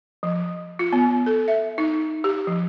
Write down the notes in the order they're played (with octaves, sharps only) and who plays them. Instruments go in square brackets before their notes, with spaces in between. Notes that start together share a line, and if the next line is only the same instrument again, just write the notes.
[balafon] F3
F4
B3
A4
E5
D#4
G4
F3